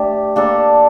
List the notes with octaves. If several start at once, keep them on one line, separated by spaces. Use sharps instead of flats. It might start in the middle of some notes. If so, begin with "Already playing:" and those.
Already playing: A3 D4 G4
A#3 D4 A4